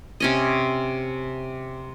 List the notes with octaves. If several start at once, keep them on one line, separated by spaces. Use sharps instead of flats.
C3 C#4 D#5